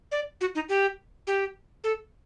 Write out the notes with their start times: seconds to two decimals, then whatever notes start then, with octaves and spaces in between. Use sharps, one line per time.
0.11 D5
0.41 F#4
0.55 D#4
0.69 G4
1.27 G4
1.84 A4